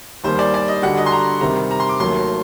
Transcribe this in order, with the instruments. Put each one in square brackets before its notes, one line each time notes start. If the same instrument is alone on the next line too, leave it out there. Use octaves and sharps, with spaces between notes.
[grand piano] D#2 D#3 G3 [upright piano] C5
[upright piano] D5
D5
D#5
[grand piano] D3 G3 D4 F#4 [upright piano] F#5
[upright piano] D#5
C6
A#5
[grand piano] C3 D#3 G3 C4 [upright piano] A#5
[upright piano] A#5
C6
D6
[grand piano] D#2 D#3 F#3 A3 [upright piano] C6